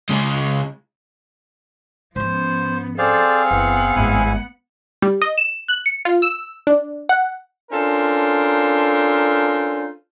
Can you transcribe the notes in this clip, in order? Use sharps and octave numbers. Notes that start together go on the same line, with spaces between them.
C#3 G#3
G#2 F3 B3 C#4 C5
C4 G#4 A4 C5 D5 F5
F#1 E3 B3 F#5
G#1 E2 G2 E4 G#5
G3
D#5
E7
F#6
C#7
F4
E6
D4
F#5
C#4 D4 F4 A4 A#4 C5